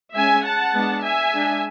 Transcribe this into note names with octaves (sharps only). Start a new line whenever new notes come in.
G#3 C#4 E5 G#5
F#5 A5
G#3 B3 D4
E5 G#5
G#3 D4